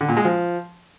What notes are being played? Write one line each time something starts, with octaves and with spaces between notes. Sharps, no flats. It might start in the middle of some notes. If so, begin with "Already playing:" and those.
D3
A#2
G#3
F3